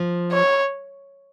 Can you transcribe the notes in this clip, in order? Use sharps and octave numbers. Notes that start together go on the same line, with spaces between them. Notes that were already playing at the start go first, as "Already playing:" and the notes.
Already playing: F3
C#5